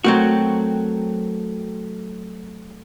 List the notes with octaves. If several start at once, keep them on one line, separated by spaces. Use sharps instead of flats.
F#3 A3 C4 F#4 A#4 G5